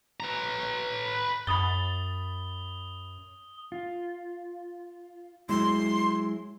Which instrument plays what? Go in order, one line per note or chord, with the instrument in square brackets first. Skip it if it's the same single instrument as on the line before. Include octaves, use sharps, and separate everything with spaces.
[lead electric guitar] B4 A#5
[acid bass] F#2 [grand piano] B5 A6 [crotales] D#6 G7
[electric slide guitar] F4
[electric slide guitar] F#3 G#3 E4 [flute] C6